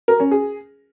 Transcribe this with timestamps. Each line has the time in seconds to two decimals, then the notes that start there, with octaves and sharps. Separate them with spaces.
0.08 A#4
0.20 C#4
0.31 G#4